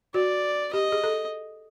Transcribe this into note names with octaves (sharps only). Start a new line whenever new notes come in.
F#4 D5
G4 D#5
G#4
A4